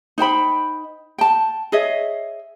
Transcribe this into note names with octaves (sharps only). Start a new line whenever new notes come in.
D#4 C5 G5 B5
G5 A5
G#4 C#5 D#5 E5